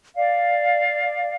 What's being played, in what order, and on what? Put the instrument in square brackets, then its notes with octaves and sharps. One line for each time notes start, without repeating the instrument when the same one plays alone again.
[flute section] D5 F5